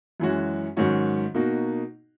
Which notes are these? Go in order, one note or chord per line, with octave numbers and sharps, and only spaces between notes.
F#2 E3 G#3 C#4 F#4
G#2 D#3 F#3 C#4 F#4
B2 A#3 D#4 F#4